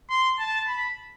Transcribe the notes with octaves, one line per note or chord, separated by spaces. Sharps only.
C6
A5
B5